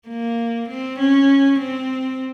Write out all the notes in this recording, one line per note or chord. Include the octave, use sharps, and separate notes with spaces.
A#3
C4
C#4
C4